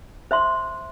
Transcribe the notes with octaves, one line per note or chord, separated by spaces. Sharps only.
C5 E5 C6